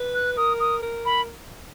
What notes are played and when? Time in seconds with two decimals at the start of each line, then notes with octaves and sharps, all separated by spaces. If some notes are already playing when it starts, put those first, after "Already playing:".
Already playing: B4
0.15 F#6
0.37 A#4 D#6
0.60 D#6
0.83 A#4
1.05 B5